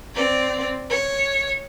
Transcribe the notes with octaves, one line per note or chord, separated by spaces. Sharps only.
C4 D5
C#5